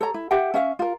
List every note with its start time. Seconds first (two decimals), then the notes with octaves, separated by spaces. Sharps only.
0.01 A4 C#5 A#5
0.14 E4
0.31 G4 E5 F#5 G5
0.54 C#4 E5 F5
0.79 F4 A#4